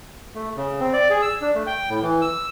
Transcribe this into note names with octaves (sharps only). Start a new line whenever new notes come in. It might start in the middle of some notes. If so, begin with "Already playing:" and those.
A3
C#3
C4
D5
G#4
E6
D4
A3
G5
A2
E3
E6